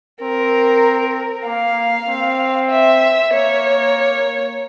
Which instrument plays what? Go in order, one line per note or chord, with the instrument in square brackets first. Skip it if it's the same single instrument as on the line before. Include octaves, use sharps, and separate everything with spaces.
[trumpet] C4 [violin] A#4
[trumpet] A#3 [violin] F5
[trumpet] C4
[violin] E5
[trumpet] A#3 [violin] C#5